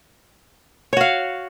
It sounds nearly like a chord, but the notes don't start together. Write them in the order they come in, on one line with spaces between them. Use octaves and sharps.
C#5 F#4 F5